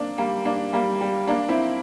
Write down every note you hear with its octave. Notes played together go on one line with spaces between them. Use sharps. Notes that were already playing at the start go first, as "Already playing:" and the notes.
Already playing: A#3 C4 D4
G3 A#3
A#3 D4
G3 A#3
G3
A#3 D4
C4 E4